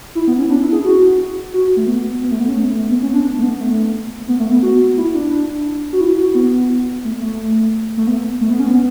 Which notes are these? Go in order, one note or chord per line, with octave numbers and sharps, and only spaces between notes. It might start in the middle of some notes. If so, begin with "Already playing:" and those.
E4
B3
C#4
D4
E4
G#4
F#4
F#4
A3
B3
B3
A3
B3
C#4
A3
A3
B3
C#4
D4
A3
B3
A3
B3
A3
B3
F#4
E4
D4
F#4
E4
F#4
B3
A3
A3
A3
B3
A3
B3
C#4
B3